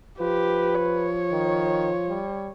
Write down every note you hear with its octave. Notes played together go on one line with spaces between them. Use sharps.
F3 G4 B4
C#5
D#3
G3